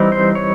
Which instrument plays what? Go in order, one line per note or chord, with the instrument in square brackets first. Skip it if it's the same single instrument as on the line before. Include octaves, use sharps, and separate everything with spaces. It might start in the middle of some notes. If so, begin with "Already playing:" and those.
Already playing: [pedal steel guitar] E3 G3 C4 D#4
C5
C#5